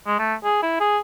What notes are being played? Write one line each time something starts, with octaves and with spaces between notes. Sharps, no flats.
G#3
A3
G#4
E4
G#4